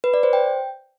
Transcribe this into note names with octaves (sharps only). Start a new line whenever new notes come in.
B4
D5
C5
G5